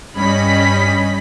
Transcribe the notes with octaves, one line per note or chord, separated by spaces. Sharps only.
G2 G3 C#4 D#5 B5 B6